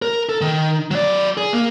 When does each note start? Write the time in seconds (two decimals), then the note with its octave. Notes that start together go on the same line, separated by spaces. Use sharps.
0.02 A#4
0.29 A4
0.41 D#3
0.91 F#3 D5
1.37 G#4
1.53 A#3